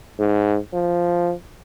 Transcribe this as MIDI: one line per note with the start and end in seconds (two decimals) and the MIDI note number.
0.19 0.57 44
0.73 1.33 53